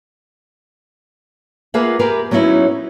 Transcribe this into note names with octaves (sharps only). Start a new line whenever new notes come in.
A#3 F4 G#4 B4 E5 F#5
G4 G#4 A#4 B4
F#3 B3 C#4 D#4 E4